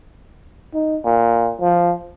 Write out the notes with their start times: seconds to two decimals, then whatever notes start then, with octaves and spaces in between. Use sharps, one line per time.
0.74 D#4
1.04 A#2
1.61 F3